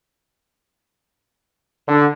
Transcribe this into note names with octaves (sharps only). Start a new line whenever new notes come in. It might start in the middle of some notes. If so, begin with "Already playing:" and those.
D3